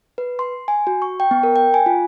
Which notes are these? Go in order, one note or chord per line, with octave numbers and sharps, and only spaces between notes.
B4
C6
G#5
F#4
C#6
G5
B3
A#4
G5
G#5
F4